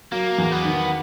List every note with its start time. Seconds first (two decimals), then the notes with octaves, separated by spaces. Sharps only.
0.12 F#3 A#3
0.38 E2
0.52 B3
0.64 D#3